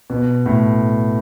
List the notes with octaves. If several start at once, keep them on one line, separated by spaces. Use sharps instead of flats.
B2
A2